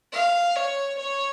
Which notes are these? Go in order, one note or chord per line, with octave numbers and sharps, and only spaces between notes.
F5
C#5
C#5